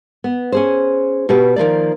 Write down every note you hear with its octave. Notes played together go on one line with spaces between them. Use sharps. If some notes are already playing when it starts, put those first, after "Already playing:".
B3
C#4 G#4 C5
B2 F#4 G4 B4
D#3 F3 A#3 D5